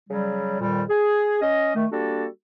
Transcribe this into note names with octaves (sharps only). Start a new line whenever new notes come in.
C#3 F#3 G3
F2 A#2 D#3 G3
G#4
C#4 D#5
D#3 A3
G3 A#3 D4 F#4 A4